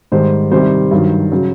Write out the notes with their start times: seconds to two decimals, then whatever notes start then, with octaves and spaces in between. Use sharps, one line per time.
0.12 G#2 D#3 G3 C5
0.51 C2 C3 D#3 G3 C5
0.91 G2 D#3 F#3
1.31 C#3 F#3